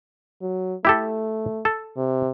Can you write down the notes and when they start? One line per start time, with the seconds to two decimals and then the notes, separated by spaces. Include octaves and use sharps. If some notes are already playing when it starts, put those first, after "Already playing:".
0.42 F#3
0.85 A3 E4 G4 A4
1.65 A4
1.97 C3